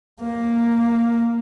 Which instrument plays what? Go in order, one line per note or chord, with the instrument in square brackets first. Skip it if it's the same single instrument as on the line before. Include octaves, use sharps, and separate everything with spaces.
[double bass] A#3